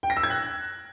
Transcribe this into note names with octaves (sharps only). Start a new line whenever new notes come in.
G5
A#6
E6
G#6
F#6